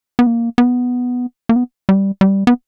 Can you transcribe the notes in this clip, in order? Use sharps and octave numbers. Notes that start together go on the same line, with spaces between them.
B3
A#3
B3
A#3
B3
G3
G3
B3